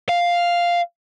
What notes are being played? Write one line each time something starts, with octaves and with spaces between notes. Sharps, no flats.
F5